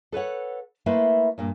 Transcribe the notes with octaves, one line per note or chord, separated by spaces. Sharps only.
A4 B4 C#5 F#5
A3 A#3 E4 B4 C5 E5
G2 A#2 A#3